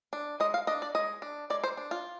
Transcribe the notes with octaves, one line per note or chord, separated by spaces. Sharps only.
D4
G#3 D#5
F5
D4 D#5
D5
G#3 D#5
D4
G#3 D5
C5
D4
F4